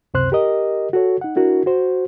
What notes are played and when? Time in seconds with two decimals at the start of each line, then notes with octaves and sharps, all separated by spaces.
0.14 C#2 F#2 C3 C5 C6 F#6
0.32 G4 A#4 D#5
0.93 F#4 A4 C#5
1.21 D#4 F#5
1.36 D4 E4 F#4 A#4
1.66 F#4 C5